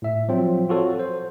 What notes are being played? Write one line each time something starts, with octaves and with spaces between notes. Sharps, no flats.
A2 E5
F3 F#3 C4 F4
F4 F#4 A4 C#5
C5